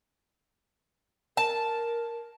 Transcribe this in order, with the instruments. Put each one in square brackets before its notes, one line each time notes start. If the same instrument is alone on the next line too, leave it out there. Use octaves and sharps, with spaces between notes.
[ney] A#4 [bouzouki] A5